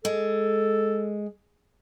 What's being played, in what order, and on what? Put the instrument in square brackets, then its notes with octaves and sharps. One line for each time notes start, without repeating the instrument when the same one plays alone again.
[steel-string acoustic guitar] G#3 [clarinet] A4